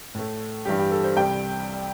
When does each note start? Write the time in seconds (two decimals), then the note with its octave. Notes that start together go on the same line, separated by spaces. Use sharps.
0.14 A2 A3
0.65 G2 E3 G3 G4
0.79 G4
0.91 A4
1.04 C5
1.16 C2 C3 G3 G5